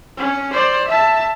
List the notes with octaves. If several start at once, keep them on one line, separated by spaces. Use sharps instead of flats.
C#4
C5 D5
E5 A5